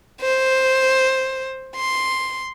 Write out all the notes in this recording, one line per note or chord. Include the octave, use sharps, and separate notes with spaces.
C5
C6